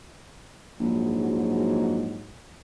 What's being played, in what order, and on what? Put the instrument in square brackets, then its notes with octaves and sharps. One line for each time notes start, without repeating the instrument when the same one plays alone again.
[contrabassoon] A#1 [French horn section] G#2 F#3